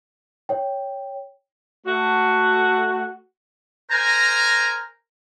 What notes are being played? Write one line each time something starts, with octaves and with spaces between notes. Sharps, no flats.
C#5 G5
A3 F#4
A#4 C5 G#5 A#5